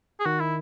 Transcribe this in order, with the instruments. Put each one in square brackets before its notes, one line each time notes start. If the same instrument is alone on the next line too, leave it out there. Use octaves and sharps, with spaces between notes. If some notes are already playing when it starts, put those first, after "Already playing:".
[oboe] G#4
[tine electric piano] D#3 [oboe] F#4
[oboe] E4